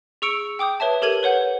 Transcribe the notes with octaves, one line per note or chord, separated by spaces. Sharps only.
G#4 C#6 E6 C#7 D7
G5 D6 D#6 G6
B4 C#5 E5 A5
G4 A4 A#4 G#6 D#7 F#7
B4 C#5 F#5 G6